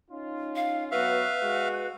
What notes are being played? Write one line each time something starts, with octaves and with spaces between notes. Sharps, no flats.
C#4 D#4 F4
F5
F#3 B3 F#4 B4 E5 F5
G#3 F#4